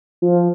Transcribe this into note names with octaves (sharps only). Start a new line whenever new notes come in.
F3